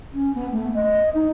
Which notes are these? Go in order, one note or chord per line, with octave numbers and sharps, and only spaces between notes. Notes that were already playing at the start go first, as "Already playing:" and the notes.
C#4
B3
A3
D#5
D#4